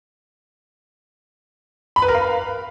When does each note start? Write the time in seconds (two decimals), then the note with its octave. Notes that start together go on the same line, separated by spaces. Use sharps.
1.96 B5
2.02 B4
2.08 A#4
2.14 F5